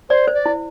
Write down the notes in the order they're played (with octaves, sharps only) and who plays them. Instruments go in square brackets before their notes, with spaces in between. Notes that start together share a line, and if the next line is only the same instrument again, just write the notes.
[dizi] C5 [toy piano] D5
[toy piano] C5
[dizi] D5
[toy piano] E4